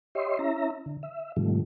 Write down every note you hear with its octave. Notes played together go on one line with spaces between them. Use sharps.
G4 C#5 D#5 E5 C6
C#4 E4 E5 A#5
D3
E5
G#2 C3 D#3 F3 G3 A3